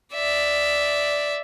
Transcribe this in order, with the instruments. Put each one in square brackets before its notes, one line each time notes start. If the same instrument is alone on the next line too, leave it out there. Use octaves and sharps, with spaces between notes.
[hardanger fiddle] D5 E5